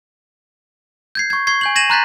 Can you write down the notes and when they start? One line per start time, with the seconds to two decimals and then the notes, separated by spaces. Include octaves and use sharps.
1.15 G6 G#6 C7
1.30 C#6 G#6
1.47 C#6 G#6 C7
1.61 G#5 G6 F#7
1.76 G#6 A#6 D#7 E7 F#7
1.90 A#5 C6 F#6 G6 A6 B6